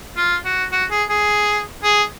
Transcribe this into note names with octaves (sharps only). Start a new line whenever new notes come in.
F4
F#4
F#4
G#4
G#4
G#4